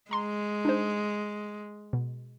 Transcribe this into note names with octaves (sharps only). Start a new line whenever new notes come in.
G#3 A#5 C6
D4 D#4 C5
B2